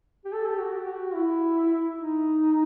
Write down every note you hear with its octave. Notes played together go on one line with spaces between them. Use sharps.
G4
A4
G4
F#4
G4
F#4
E4
D#4